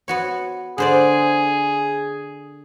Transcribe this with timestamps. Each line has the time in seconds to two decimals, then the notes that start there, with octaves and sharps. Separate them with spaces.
0.08 B3 F#4 C#5
0.78 D3 G#4 C5 D5